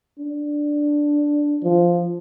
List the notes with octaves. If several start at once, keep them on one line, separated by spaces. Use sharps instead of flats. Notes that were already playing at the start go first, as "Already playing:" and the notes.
D4
F3